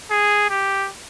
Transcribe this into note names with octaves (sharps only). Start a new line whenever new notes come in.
G#4
G4